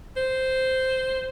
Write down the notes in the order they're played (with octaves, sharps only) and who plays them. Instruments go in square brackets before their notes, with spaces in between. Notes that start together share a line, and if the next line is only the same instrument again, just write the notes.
[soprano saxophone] C5